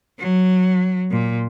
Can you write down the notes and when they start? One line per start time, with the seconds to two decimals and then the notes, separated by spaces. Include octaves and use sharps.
0.19 F#3
1.11 A#2